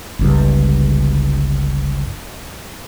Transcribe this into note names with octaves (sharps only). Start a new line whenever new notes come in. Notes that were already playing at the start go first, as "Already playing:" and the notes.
G1 C#2 G2